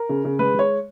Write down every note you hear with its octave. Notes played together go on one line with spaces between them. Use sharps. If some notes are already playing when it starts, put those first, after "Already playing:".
Already playing: A#4
C#3
C#3
G#3 B4
G#3 C#5